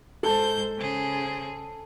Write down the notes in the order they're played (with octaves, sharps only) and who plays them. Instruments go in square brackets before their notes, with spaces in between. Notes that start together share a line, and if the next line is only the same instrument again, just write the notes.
[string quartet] G#2 C5 G6 [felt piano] A4 A5
[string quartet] C#3 G#4 C5